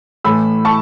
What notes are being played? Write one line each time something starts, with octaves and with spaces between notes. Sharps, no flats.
A2 E3 A3 B5 E6
A5 C#6